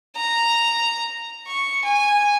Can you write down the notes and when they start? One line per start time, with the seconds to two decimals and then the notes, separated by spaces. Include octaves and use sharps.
0.16 A#5
1.47 C#6
1.85 G#5